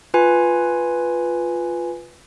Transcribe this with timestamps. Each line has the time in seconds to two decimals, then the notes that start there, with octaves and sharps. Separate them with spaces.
0.14 F4 B4 G#5